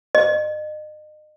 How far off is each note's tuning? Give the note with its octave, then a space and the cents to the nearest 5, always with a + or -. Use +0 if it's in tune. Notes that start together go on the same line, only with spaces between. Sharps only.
D#5 -35